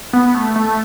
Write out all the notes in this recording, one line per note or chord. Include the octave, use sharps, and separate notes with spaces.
B3
A3
A3